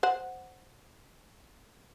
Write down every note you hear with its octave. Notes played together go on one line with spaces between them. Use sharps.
C5 F#5